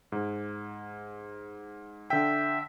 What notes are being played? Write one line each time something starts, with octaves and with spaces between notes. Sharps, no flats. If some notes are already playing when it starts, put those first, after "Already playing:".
G#2
D3 E5 G5